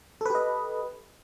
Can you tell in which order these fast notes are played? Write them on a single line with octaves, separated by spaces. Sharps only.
A4 B4 G4 D#5